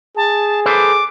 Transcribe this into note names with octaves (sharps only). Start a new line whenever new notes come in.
G#4 A5
A4 B4 C5 D6